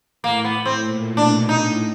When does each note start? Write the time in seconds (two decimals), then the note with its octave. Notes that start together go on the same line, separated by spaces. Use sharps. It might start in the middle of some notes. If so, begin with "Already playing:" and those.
0.24 A2 A#3
0.44 B3
0.65 C4
0.86 A#2
1.17 B2 D4
1.48 A2 D#4